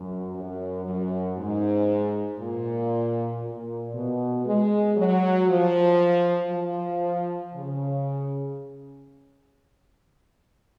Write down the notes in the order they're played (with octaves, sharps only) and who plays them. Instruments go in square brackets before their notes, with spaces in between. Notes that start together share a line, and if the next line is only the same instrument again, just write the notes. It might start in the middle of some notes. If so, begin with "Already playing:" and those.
Already playing: [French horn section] F#2
F#2
F#2
G#2
A#2
A#2
B2
G#3
F#3
F3
F3
C#3